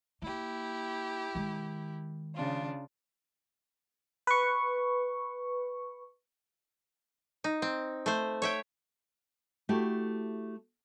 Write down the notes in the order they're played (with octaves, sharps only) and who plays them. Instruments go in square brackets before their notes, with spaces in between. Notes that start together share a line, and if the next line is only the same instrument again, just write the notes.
[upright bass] A#3 [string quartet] E4 G4
[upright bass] D#3 G#3
[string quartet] C#3 D4 F4
[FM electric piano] B4 C#6
[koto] D#4
C4
A3 C5
C#5 E5 G5
[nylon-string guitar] A3 E4 F#4 G4